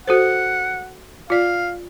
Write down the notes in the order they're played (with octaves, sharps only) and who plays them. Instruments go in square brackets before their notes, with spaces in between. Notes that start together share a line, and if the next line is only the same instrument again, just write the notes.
[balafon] F#4 A4 C5 [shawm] F#5
[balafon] F4 D5 [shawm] F5